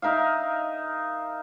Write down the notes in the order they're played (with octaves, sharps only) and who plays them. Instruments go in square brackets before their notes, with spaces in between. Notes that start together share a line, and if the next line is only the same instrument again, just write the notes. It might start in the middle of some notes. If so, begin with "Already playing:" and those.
[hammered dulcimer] D#4 A#4 E5 F5